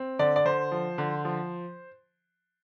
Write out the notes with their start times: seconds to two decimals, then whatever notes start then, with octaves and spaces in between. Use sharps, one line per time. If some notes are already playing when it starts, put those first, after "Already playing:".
Already playing: C4
0.19 D3 D5
0.36 D5
0.45 D3 C5
0.72 F3
0.98 D3
1.25 F3